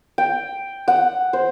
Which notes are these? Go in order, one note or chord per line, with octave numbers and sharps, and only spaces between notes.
G5
F#5
C5